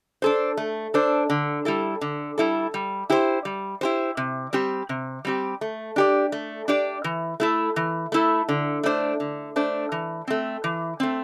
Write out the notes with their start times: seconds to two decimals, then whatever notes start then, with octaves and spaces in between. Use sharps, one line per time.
0.22 D4 A4 C5
0.57 A3
0.94 D4 A4 C5
1.30 D3
1.65 G3 E4 A4
2.01 D3
2.38 G3 E4 A4
2.74 G3
3.10 E4 G4 C5
3.45 G3
3.81 E4 G4 C5
4.17 C3
4.53 G3 C4 G4
4.89 C3
5.25 G3 C4 G4
5.61 A3
5.96 D4 G4 D5
6.32 A3
6.68 D4 G4 D5
7.04 E3
7.40 A3 E4 A4
7.76 E3
8.12 A3 E4 A4
8.49 D3
8.83 A3 D4 C5
9.20 D3
9.56 A3 D4 C5
9.92 E3
10.27 A3 C4
10.64 E3
11.00 A3 C4